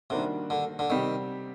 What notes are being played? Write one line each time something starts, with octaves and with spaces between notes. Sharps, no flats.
C3 D#3 G3 A#3 D4 F#4
D3
D3
C3 D#3 G3 C4 G4